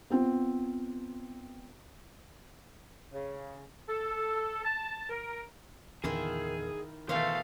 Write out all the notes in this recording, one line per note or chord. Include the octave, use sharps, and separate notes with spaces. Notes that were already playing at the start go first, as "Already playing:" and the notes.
B3 C4 F4
C#3
A4
A5
A#4
E2 A#2 D3 D#3 E4 F4 G#4
B2 D#3 E3 A3 C5 F5